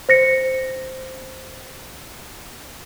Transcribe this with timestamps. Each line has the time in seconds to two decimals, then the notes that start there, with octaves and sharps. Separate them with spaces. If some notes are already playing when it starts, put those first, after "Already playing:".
0.09 C5 A#6 C#7